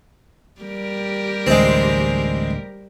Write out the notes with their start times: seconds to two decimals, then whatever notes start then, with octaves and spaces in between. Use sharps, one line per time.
0.61 G3 G4 A#4
1.47 A1 D2 G#3 C4